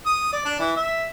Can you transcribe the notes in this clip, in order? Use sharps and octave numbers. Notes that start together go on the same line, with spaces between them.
D#6
D5
D4
E3
E5